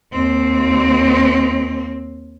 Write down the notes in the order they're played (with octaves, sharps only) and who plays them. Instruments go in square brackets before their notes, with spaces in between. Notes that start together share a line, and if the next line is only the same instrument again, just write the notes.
[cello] D#2 C4